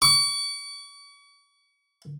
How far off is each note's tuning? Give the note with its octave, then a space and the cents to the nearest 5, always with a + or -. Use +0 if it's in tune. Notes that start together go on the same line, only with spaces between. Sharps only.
C#6 +40